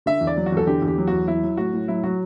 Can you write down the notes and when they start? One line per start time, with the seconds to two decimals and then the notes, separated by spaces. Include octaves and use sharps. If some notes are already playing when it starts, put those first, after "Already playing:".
0.06 D3 E5
0.21 E2
0.27 D5
0.37 F#3
0.46 F#4
0.52 E2 A4
0.67 D3 G4
0.82 E2
0.88 G4
0.98 F#3
1.07 E2 F#4
1.27 F#3 E4
1.43 F#3
1.57 A2 F#4
1.73 A2
1.88 F#3 E4
2.04 F#3 F#4